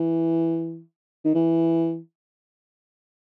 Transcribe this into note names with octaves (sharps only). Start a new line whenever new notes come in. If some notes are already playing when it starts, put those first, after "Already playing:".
Already playing: E3
D#3
E3